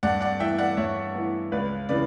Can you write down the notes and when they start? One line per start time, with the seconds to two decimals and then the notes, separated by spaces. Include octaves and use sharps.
0.03 G2 D5 F#5
0.21 D5 F#5
0.40 E3 B3 E5 G5
0.58 D5 F#5
0.77 G2 C#5 E5
1.15 E3 B3
1.52 C#2 B4 D5
1.89 C#3 E3 B4 D5